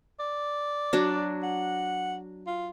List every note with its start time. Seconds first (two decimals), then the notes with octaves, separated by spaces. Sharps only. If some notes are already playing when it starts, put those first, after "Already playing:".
0.20 D5
0.93 F#3 D4
1.43 F#5
2.47 F4